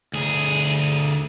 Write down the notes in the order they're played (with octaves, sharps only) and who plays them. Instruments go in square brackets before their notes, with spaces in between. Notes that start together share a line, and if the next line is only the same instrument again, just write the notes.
[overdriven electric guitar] D2 G#4